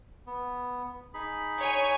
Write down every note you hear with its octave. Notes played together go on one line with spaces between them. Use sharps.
B3
D#4 G#4 B5
C#5 G#5